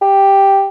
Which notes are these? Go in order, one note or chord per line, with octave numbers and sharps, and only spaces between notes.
G4